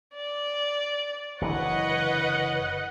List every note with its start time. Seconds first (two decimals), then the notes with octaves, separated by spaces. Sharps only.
0.16 D5
1.41 F#1 D3 E3 B4 C#5 D#5 F#5